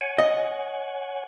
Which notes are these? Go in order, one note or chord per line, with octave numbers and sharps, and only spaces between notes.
C#5 F#5 G#5
D#5